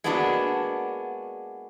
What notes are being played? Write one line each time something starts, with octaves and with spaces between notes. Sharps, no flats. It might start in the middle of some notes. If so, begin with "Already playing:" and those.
G#3 A#3 B3 D4 E4 F#4